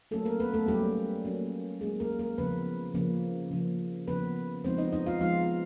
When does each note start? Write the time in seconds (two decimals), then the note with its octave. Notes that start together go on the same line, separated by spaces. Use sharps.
0.11 F#3 A3 A#3 C#4 A4
0.25 A#3 A#4
0.40 B3 B4
0.54 A3 A4
0.68 F#3 G3 A#3 C#4 G4
1.25 F#3 A#3 C#4
1.81 F#3 G#3 A#3 C#4 G#4
2.00 A#3 A#4
2.19 A#3 A#4
2.38 C#3 F3 A#3 B3 B4
2.94 C#3 F3 A#3
3.51 C#3 F3 A#3
4.08 C#3 F3 A#3 B3 B4
4.64 F3 G#3 B3 C4 D#4 C5
4.78 D#4 D#5
4.93 D#4 D#5
5.07 F4 F5
5.21 F3 G#3 B3 D#4 F4 F5